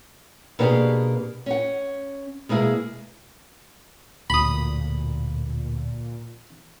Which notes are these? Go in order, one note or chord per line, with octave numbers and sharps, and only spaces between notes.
B2 A#3 B3 D4 G4 G#4
C#4 F#5
B2 G#3 A#3 E4 G#4
D1 D2 A#2 B5 D#6